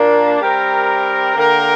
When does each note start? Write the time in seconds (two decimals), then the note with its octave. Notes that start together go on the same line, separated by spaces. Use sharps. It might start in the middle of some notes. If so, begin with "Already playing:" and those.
Already playing: A#2 A#3 D4 A#4
0.41 G3 C4 G4 A#4
1.36 D3 A#3 G4 A#4